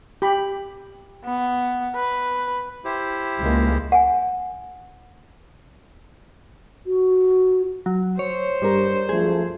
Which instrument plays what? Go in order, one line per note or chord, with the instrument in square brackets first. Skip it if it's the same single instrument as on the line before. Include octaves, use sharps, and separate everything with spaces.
[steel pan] G4 B5
[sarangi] B3
B4
[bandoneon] E4 G4 C5
[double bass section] C#2 G#3 A#3
[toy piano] F#5 G#5
[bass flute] F#4
[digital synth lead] F#3
[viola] C5 [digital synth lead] C#5
[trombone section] G2 [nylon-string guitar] G3 A#4
[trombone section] F#2 F3 A3 [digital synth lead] G#4